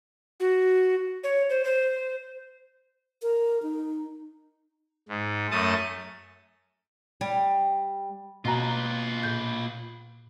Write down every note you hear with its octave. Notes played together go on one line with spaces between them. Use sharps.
F#4
C#5
C5
C5
A#4
D#4
G#2
F#2 A3 A5 D#6
G3
B2 A#3 F4 B4 A#5
A#2 G6